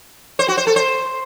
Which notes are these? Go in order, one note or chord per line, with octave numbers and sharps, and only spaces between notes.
C5
F#4
C5
A4
C5